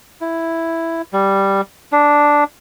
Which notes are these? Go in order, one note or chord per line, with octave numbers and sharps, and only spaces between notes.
E4
G3
D4